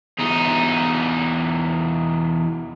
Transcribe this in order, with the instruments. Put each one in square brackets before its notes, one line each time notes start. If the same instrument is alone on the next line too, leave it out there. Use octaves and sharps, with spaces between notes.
[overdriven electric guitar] E2 D#4